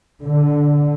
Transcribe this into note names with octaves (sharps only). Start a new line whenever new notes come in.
D3